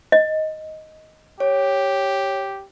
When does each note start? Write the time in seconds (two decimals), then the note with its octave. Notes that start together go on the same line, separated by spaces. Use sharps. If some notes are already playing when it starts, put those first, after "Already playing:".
0.12 D#5
1.40 G4 C#5